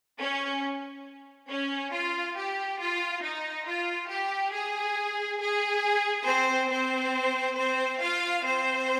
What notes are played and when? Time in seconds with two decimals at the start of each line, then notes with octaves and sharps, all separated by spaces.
0.19 C#4
1.49 C#4
1.93 F4
2.36 G4
2.80 F4
3.23 D#4
3.67 F4
4.09 G4
4.53 G#4
5.41 G#4
6.26 C4 C5
6.71 C4 C5
7.57 C4 C5
8.01 F4 F5
8.44 C4 C5